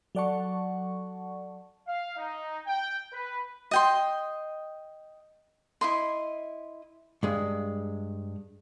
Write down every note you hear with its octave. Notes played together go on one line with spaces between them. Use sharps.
F#3 A4 D5 F#5 A5 C#6
F5
D#4
G5
B4
D#5 G5 C6
E4 D#5 C6
G2 G#3